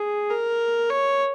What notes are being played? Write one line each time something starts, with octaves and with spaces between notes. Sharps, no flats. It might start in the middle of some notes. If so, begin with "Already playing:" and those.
Already playing: G#4
A#4
C#5